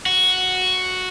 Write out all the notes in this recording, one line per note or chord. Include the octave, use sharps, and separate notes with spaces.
F#4